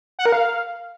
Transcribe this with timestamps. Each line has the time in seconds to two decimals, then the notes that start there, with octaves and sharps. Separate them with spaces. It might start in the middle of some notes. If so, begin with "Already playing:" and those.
0.19 F#5
0.26 A#4
0.32 F5